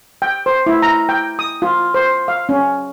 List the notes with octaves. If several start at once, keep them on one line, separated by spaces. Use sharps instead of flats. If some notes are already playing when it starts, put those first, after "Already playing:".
G5
C5
E4
A#5
G5
D#6
F4
C5
F5
C#4